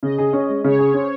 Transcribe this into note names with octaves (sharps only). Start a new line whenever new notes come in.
C#3 D#5
G#4
C#4
G#3
C#3 C#5
G#4
C#4 C5